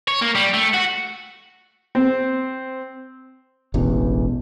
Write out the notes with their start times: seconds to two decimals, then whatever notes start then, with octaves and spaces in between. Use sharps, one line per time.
0.08 C#5
0.21 A#3
0.35 G3
0.54 A3
0.74 F#4
1.95 C4
3.74 E1 A1 E2